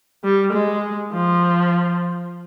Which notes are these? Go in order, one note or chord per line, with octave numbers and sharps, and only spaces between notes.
G3
G#3
F3